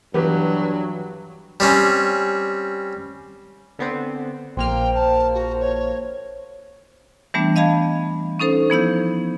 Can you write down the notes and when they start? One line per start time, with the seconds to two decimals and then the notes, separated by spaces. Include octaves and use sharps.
0.14 G2 E3 F#3 B3 G4 B4
1.60 G3 C4 C#4
3.79 D3 B3 C4
4.57 A#1 A#3 C5 G5 F6
4.95 A5
5.34 F#4
5.60 C#5
7.34 E3 G3 A3 B3 D4
7.56 D#5 F5 A5 B5 G#6
8.40 C#4 D#4 A4 C5
8.70 F3 B3 E4 G6